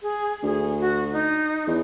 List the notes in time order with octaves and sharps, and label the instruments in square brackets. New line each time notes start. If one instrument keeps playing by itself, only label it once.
[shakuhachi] G#4
[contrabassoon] D2 [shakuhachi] G#4
[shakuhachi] F#4
D#4
[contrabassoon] E2